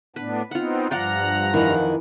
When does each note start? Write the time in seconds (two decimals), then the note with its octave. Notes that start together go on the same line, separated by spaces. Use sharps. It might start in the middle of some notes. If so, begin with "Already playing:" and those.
0.16 A2 B3 D4 B4
0.51 B3 C4 D#4 F4 F#5
0.91 G2 F3 D5 F5 F#5 A#5 C6
1.54 F2 D#3 E3